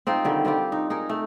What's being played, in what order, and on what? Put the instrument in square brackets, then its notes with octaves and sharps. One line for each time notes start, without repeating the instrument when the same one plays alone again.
[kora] C4 D#4 F4
D3 D#3 G3
G3 C4 F4 G4
D#4
D#4 G#4 A#4
A3